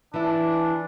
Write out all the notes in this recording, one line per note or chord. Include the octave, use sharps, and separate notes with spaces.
E3 D4 E4